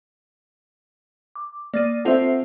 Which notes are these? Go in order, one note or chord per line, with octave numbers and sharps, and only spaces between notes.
D6
A#3 D5 A6 D#7
C4 F4 A4 C5 E5 F#5